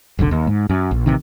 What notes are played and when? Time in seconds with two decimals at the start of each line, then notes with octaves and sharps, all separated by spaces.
0.19 F1 B1 G#2 D3
0.31 D#2
0.47 G#2
0.70 F#2
0.91 A#1
1.06 A1 G2 C3 D#3